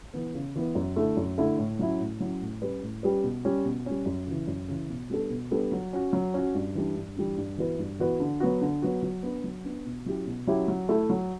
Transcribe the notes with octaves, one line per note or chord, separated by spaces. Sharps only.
E3 B3
C#3
E3 B3
F#2
D3 A3 E4 A4
F#2
D3 A3 E4 A4
A2
F#3 C#4 E4
A2
F#3 C#4 E4
A2
G3 C#4 G4 B4
A2
G3 C#4 G4 B4
B2
G3 C#4
B2
G3 C#4
F#2
C#3 E3
F#2
C#3 E3
B2
G3 B3 D4 A4
B2
G3 B3 D4 A4
F#3
C#4 F#4
F#3
C#4 F#4
G2
E3 G3 D4
G2
E3 G3 D4
G2
E3 B3 F#4 B4
G2
E3 B3 F#4 B4
D3
F#3 B3 F#4
D3
F#3 B3 F#4
F#3
B3 D4
F#3
B3 D4
B2
F#3 C#4 E4 G4
B2
F#3 C#4 E4 G4
F#3
A3 E4 A4
F#3